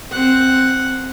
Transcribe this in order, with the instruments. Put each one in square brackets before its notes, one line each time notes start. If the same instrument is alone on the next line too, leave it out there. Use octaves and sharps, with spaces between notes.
[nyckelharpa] C4 F#5